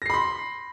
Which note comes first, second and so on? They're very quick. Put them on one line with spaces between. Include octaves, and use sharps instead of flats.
A#6 C7 B5 C6